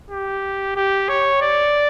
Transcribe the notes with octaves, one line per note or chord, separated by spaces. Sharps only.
G4
G4
C#5
D5